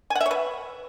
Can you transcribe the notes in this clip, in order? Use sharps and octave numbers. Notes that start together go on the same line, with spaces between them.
G#5
F#5
E5
C#5
B4